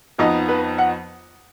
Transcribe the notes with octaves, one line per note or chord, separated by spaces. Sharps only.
F2 F3 B3 D#4 D#5
B4
F#5